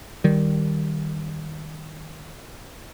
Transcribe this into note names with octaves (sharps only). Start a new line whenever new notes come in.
D#3 G3